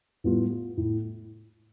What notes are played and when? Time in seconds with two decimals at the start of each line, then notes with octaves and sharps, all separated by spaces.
0.24 A2 G3 B3 F4
0.77 A2